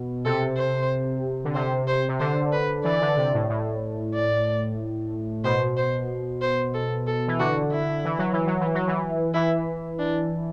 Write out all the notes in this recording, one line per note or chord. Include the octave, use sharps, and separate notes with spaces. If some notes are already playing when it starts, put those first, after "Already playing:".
Already playing: B2
C3 A4
C5
D3
C3 C5
C5
C3
D3 C5
B4
E3 D5
D3
C3
A2
A2
D5
B2 C5
C5
C5
A4
A4
E3
D3 F#4
E4
E3
F#3
E3
F#3
E3
F#3
E3
E3 E4
D4